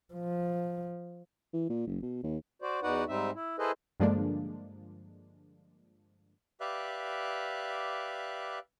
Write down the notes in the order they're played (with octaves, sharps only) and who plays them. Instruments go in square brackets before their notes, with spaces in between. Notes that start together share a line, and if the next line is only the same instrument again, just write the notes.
[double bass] F3
[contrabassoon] E3
A#2
F#1
B2
D#2
[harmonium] F#4 C5 D5
E2 D#4 F#4 B4 D5 F#5
G#2 G3 C4 D#4 E5
E4
E4 G#4 A4 B4 C5 D#5
[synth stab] G2 D3 F3 G#3 A#3 D4
[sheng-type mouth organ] G4 B4 D5 E5 F5 F#6